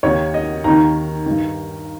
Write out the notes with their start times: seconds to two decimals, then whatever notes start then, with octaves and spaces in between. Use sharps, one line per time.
0.03 D#2 D#3 C#5
0.34 D#5
0.64 D#2 D#3 A#5
1.26 G2 D#3